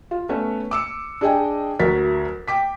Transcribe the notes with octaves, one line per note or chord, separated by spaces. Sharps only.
F4
A3 B3 C#4 C#5
D6 E6 C#7
D4 G#4 D#5 G5 G#5
D2 F#3 F#4 A#4 A6 B6
G5 D6 B6